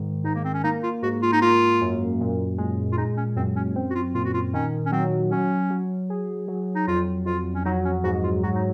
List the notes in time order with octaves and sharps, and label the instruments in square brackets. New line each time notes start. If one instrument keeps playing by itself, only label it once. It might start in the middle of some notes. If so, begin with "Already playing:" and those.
Already playing: [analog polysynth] G#2 D#3
[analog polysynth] G#2 [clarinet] D#4
[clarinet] A#3
C4
C#4
[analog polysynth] A#3 [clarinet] D#4
[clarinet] F4
[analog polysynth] G#2 [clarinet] F#4
[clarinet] F4
D#4
[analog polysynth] A#3 [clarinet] F4
[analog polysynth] F#2
A#2
G#3
[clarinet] F4
[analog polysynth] G#3 [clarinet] D#4
[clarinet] C#4
[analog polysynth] F#2 [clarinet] C4
[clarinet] C#4
[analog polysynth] C4
[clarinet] F#4
F4
[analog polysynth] A#2 [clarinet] F4
[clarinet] F#4
F4
[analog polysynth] D#3 [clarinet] C#4
[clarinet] C#4
[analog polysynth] F#3 [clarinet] C4
[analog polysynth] F#3 [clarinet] C#4
[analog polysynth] F#3
G#4
F#3
[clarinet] D#4
[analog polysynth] F2 [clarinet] F4
[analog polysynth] F2 [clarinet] F4
[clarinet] C#4
[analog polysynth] F#3 [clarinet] D#4
[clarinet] C#4
[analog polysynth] G#2 [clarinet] F#4
[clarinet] F4
[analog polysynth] F#3 [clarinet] F#4
[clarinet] D#4